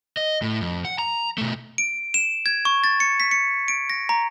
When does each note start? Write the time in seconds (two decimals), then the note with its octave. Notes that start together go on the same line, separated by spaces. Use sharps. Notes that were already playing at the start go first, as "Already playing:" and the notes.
0.17 D#5
0.42 A2
0.61 F2
0.85 F#5
0.99 A#5
1.38 B2 A3
1.78 D7
2.14 E7
2.46 G#6
2.65 C#6
2.84 A6
3.00 C#7
3.20 B6
3.31 C#7
3.68 D7
3.90 A#6
4.09 A#5